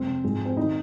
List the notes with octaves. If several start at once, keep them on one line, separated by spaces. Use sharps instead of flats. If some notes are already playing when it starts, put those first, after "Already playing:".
Already playing: F2 C3 G#3 C4
G#2 F3 G#3
C4
D#3 G#3 D#4